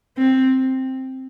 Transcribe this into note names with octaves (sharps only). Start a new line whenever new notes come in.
C4